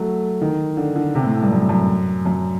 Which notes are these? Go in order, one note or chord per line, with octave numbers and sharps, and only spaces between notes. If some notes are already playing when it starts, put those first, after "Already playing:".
Already playing: F#3 A3
D#3
D3
D3
C3
A2
A2
G2
F#2
F#2
F#2